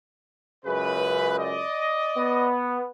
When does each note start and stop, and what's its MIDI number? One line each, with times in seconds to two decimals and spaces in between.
0.65 1.61 37
0.65 1.61 42
0.65 1.61 49
0.65 1.35 71
1.38 2.52 74
1.38 2.52 75
2.17 2.90 59